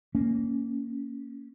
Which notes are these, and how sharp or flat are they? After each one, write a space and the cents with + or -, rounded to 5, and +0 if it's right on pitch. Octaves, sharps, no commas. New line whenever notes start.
A#3 -10 C#4 +5